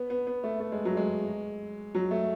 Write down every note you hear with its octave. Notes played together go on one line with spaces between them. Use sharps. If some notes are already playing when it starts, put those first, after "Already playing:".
Already playing: B3
B3
B3
A3
A3
G#3
F#3
G#3
F#3
A3